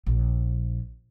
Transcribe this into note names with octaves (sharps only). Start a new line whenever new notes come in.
A#1